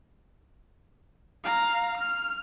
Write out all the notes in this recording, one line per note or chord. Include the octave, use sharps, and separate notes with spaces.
F5 A#5
F6